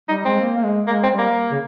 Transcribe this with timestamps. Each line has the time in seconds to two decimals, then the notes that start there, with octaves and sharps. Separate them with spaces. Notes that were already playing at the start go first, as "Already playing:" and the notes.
0.09 G3 D#4
0.25 G#3 C4
0.41 A#3
0.58 A#3
0.64 G#3
0.88 G#3 A#3
1.03 C4
1.11 G3
1.19 A#3
1.51 C#3